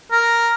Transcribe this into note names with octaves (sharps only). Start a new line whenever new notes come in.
A#4